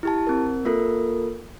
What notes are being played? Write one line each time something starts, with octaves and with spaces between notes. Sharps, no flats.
E4 G4 A5
C4 A#4
A#3 F4 A4 A#4